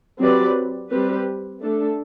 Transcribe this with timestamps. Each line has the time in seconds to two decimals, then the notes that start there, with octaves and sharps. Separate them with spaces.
0.19 F#3 C4 G4 B4 D5
0.90 G3 C4 G4 B4
1.60 A3 D4 A4